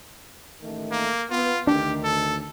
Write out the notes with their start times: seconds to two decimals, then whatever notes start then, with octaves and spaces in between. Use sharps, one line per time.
0.62 A1 D#3 A3
0.92 A#3
1.31 B3 F4
1.67 D2 D#3 D4 G4
2.04 A4